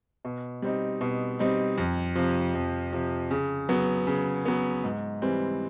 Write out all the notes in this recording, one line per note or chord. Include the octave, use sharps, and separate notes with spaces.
B2
G3 C4 D#4
B2
G3 C4 D#4
F2
C3 F3
F2
C3 F3
C#3
F#3 B3
C#3
F#3 B3
G#2
E3 G3 C4